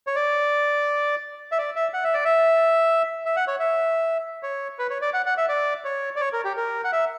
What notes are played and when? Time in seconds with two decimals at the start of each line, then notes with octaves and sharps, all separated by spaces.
0.07 C#5
0.16 D5
1.52 E5
1.58 D5
1.76 E5
1.94 F#5
2.04 E5
2.14 D5
2.25 E5
3.26 E5
3.36 F#5
3.47 C#5
3.59 E5
4.43 C#5
4.79 B4
4.90 C#5
5.02 D5
5.14 F#5
5.26 F#5
5.37 E5
5.49 D5
5.85 C#5
6.16 D5
6.21 C#5
6.33 A#4
6.44 G4
6.57 A#4
6.84 F#5
6.92 E5